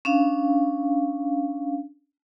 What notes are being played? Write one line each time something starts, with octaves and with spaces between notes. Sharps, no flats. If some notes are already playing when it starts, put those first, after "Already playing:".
C#4 D4 F5